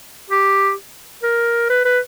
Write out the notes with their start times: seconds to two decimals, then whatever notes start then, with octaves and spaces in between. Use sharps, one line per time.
0.30 G4
1.23 A#4
1.69 B4
1.85 B4